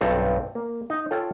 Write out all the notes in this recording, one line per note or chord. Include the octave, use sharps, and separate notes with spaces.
B1 G2 C4 A4
A#3
D#4
F4 A4 C#5 G5